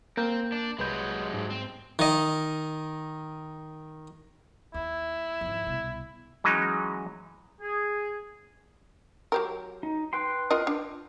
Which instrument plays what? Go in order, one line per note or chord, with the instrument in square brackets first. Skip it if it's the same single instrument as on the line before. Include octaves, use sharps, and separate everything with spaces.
[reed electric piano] A#3 A#4 G6 [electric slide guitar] C4
[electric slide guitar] D4
[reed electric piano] C2 B4 G6 [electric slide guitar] F#3 G#3
[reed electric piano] G#2
[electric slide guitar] C4
[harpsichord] D#3 D#5
[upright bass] D#2 [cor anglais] E4
[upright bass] G#1 F2
C2 B2
[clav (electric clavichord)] E3 F#3 G#3 C#4 D#4
[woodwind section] G#4
[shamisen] F#3 G4 A#4
[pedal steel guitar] D#4
B4 G5 C6
[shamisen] F4 A#4 D#5
D4